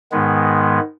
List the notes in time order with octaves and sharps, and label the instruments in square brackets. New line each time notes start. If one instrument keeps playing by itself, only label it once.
[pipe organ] G#2 D#3 G#3 B3